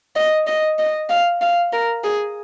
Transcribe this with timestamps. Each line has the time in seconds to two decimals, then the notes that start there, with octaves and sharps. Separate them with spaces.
0.16 D#5
0.47 D#5
0.79 D#5
1.10 F5
1.41 F5
1.73 A#4
2.04 G#4